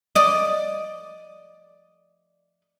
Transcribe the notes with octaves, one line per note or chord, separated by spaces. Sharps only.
D5 D#5